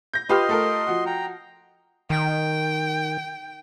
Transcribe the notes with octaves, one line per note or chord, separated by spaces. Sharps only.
G6 A#6
F4 G4 B4 D#5 C6 F6
A3 A4 A#4
F3 F#4
G5 A#5
D#3 G5